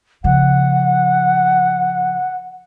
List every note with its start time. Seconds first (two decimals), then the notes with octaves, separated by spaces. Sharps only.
0.24 C#3 F3 F#5